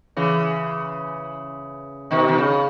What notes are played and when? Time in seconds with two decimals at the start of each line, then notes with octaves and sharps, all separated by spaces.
0.17 C#3 E3
2.11 B2 D#3
2.28 D#3
2.38 C#3